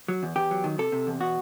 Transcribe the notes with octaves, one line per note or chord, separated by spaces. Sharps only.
F#3
E2
E2 G4
F#3
D#3
C3 A4
C3
E2
B2 F#4